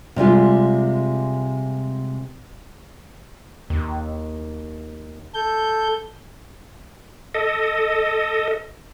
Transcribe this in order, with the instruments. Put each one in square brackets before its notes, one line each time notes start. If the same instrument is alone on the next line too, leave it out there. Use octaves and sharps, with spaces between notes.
[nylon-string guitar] C3 G3 G#3 F4
[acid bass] D#2
[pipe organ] A4 G6
[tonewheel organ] A4 D#5